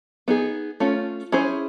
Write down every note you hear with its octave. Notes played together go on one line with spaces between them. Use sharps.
B3 D#4 G#4
A3 C#4 F4
C#4 E4 G#4 C5